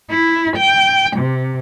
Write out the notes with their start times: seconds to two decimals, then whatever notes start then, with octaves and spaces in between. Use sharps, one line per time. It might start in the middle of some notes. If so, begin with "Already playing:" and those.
0.11 E4
0.57 G5
1.17 C3